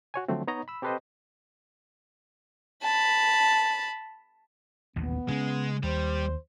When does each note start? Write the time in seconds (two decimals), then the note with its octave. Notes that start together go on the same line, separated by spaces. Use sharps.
0.14 F#4 C#5 G#5
0.28 D3 F3 F#3 A3 C4
0.47 B3 D#4 C#5 D#5 A#5
0.68 B5 E6
0.82 C4 G4 A4 B4 C5 D#5
2.82 A5 B5
4.96 A1 D#2 A#2 B3
5.29 C#3 G#3 C#4
5.83 D#2 G3 C5